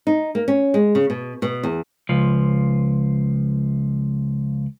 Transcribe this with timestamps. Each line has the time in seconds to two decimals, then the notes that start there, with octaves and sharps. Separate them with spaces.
0.07 D#4
0.35 A#3
0.48 C#4
0.74 G#3
0.95 C#3
1.10 B2
1.42 B2
1.63 E2
2.09 C#2 F3